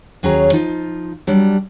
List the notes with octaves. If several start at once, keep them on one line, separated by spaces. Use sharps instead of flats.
D#2 F#3 C#4 G#4 C#5 A#5
F3 D#4 F4
F#3 G3 D4